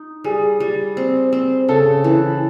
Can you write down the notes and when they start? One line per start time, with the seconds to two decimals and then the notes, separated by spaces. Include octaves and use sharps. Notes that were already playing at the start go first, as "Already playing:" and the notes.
Already playing: D#4
0.24 G3 G#4
0.60 G3
0.97 C4
1.33 C4
1.68 C#3 A4
2.04 E3